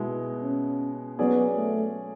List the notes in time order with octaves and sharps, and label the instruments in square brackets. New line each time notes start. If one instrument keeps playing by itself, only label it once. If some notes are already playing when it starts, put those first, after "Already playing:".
Already playing: [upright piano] B2 G#3 B3 E4
[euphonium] C#4
[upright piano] F#3 C#4 G#4 D5 [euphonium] B3
[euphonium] A3